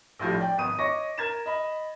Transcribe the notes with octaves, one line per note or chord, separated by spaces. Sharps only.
A#1 A2 F3 G3
D5 G5
G#1 B3 D#6 D#7
C#5 D#5 C#6 D6 A#6
A#4 G#6 A6 E7
D#5 B5